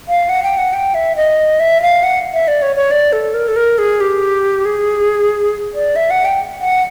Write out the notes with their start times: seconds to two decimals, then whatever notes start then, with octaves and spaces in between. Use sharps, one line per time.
0.08 F5
0.29 F#5
0.43 G5
0.57 F#5
0.73 G5
0.94 E5
1.16 D#5
1.60 E5
1.82 F5
2.03 F#5
2.33 E5
2.48 D5
2.62 C#5
2.76 C#5
2.91 D5
3.12 A4
3.34 A#4
3.48 A4
3.56 A#4
3.78 G#4
4.00 G4
4.65 G#4
5.74 D5
5.96 E5
6.10 F#5
6.25 G5
6.61 F#5